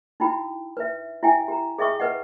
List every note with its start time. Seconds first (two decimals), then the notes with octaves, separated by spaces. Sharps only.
0.20 D#4 E4 F#4 G5 B5
0.77 B4 E5
1.23 E4 G4 E5 G5 G#5
1.48 G4 A#5
1.79 G#4 D#5 E5 G5 C#6 D#6
2.00 B4 D#5 F#5